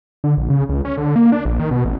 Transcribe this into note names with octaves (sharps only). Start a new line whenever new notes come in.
D3
A#1
C#3
C#2
C#4
D3
A#3
D4
A#1
D#3
B2
A1